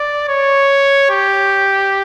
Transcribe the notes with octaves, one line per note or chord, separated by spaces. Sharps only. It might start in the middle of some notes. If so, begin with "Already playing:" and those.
Already playing: D5
C#5
G4